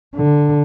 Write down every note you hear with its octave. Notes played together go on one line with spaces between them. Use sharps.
D3